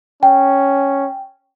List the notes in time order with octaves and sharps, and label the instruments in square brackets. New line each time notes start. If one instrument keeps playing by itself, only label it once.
[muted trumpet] C#4 [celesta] G5